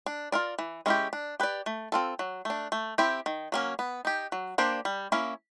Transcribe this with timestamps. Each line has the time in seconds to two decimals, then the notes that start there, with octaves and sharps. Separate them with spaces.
0.06 D4
0.32 F4 A#4 D5
0.59 E3
0.86 G#3 C#4 E4 G4
1.13 D4
1.40 G4 B4 D5
1.66 A3
1.92 C4 F4 A4
2.19 F#3
2.45 A3 D4
2.72 A3
2.98 C4 E4 G4
3.26 D#3
3.52 F#3 A#3 C#4
3.79 B3
4.05 D#4 G4
4.32 F#3
4.58 A#3 D4 G4 C5
4.85 G3
5.12 A#3 C#4 E4